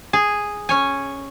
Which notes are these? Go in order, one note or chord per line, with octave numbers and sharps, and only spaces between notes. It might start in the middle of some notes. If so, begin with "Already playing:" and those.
G#4
C#4 C#5 G#5